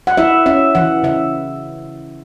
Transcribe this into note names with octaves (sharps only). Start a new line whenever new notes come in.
F#5
E4 E5
C#4 E5
E3 F#5
C#3 E5